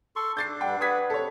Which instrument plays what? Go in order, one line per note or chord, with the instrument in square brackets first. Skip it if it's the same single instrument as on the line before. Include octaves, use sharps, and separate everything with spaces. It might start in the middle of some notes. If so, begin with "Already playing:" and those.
[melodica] A4 C6 C#6
[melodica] D4 [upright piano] G6 A6 C7
[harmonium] G2 G3 F#5 [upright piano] G5
[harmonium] B4 F#5 [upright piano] D#6 G#6 B6
[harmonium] C3 [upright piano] A4 C#5